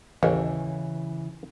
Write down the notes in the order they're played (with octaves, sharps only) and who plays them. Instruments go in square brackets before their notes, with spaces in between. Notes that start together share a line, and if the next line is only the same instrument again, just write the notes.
[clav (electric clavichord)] A1 D#2 [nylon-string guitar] C#3 E3 C#5